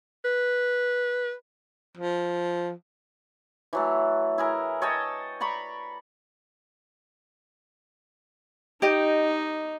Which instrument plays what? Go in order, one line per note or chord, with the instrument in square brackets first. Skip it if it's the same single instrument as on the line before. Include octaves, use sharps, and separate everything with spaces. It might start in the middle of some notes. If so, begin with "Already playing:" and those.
[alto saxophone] B4
[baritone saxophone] F3
[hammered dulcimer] E3 F#3 A3
E4 G#4 A#4
C#5 D#5 G5 A5
D5 A#5 B5 C#6
[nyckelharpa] D#4 [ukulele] G4 D#5